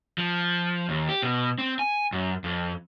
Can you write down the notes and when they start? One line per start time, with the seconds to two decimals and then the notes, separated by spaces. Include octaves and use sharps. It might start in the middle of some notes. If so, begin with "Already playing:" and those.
0.18 F3
0.89 D#2
1.09 G4
1.23 B2
1.58 C4
1.79 G#5
2.12 F#2
2.44 F2